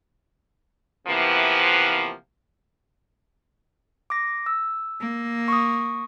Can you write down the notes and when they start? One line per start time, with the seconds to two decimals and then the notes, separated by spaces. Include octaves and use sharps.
1.07 C3 E3 F3 A#3 B3
4.10 D6 A#6
4.46 E6
5.00 A#3
5.48 C#6 D#6